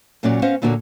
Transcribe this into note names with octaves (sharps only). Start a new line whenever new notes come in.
F#2 A#2 F#3 C#4 F#4 D5
B3 C#4 C5 D#5 F5 F#5
D#2 A#2 D3 A#3 F#4 C#5